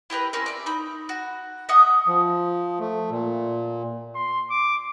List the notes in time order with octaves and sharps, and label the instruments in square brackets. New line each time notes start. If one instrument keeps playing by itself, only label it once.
[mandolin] E4 G4 A#4 B4
C4 C#4 A#4
D5 E5
D#4 B5
F#4
D#5 E5 F#5 D#6
[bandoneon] F3
A3
A#2
[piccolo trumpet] C6
D6